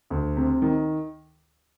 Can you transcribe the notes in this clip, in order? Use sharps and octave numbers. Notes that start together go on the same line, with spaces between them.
D2
C3
D#3